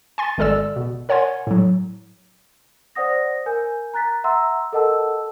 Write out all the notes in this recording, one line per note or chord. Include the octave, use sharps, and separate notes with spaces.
G#5 C6 A6
G#1 G#3 A4 D5 E6
B2
A#4 C#5 F#5 G#5 C6 G#6
A2 F#3
C5 D5 F#5 D#6 A#6
A#4 G#5 G6
A#5 F#6 A6 B6
E5 F#5 A#5 C6 E6
A4 A#4 D#5 F#5 A5 E6